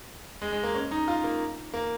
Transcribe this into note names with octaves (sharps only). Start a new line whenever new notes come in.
G#3
G#3
A#3
C#4
D#4
F4
A#3
A#3